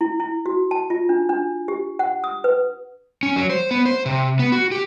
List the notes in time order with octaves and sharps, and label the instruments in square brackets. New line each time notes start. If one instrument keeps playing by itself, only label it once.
[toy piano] E4
E4
F#4
A5
F4
D4
D4
G4
F#5
D#6
B4
[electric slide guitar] C#4
F#3
C5
B3
C5
C3
B3
F#4
G4